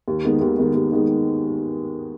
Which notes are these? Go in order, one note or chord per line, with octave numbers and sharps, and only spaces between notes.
D#2
D#3 G#3 B3
D#2
D#3 G#3 B3
D#2
D#3 G#3 B3